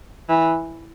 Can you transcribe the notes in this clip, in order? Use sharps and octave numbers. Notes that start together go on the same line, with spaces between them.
E3